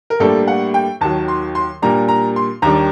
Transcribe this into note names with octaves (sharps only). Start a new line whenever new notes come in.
A#4
A2 G3 A#3 D4 A4
F#5
G5
D#2 D#3 F#3 A5
C6
C6
A#2 G3 A#3 D4 A#5
A#5
C6
D#2 D#3 G3 D4 A#5